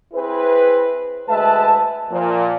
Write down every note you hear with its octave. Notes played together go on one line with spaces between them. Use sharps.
C4 E4 G#4 B4
D2 G#3 B4 E5 A5
A#2 F3